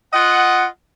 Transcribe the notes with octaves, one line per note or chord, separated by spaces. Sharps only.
F4 D#5 F#5